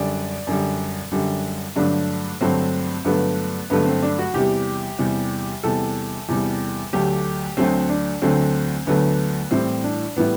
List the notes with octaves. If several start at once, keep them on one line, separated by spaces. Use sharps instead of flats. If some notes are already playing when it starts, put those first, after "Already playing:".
Already playing: F#2 D3 G3 D5
F#2 D3 G3
F#2 D3 G3
G2 D3 F#3 A3 D4
G2 D3 F#3 A3 C4
G2 D3 F#3 A3 B3
G2 D3 F#3 A3 B3
C4
D4
F#4
E2 C3 G3 G4
E2 C3 G3
E2 C3 G3 A4
E2 C3 G3
D2 D3 F#3 A3 G4
D2 D3 F#3 A3 C4
D4
D2 D3 F#3 A3 C4
D2 D3 F#3 A3 B3
A2 E3 G3 C4
D4
A2 E3 G3 B3